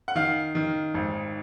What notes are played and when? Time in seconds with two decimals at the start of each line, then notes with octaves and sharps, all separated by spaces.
0.08 F#5
0.15 D#3 F5
0.55 D#3
0.94 G#1